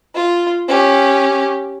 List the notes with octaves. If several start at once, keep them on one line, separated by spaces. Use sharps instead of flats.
F4
C#4 G4